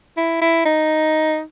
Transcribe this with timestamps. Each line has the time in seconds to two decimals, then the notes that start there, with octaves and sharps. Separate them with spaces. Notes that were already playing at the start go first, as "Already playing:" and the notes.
0.17 E4
0.41 E4
0.65 D#4